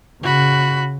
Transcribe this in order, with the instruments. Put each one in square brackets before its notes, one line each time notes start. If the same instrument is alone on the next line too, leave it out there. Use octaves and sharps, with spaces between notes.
[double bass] C#3 [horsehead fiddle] F#4 B5